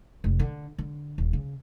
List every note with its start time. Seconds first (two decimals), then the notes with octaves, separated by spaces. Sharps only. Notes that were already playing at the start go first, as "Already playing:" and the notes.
0.24 F1
0.39 D3
0.78 D3
1.18 D#1
1.33 C#3